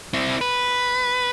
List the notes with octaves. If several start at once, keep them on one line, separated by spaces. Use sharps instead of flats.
C4 E4
B4